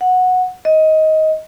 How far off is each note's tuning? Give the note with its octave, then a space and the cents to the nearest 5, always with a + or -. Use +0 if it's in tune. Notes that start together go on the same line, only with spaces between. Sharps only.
F#5 -10
D#5 +15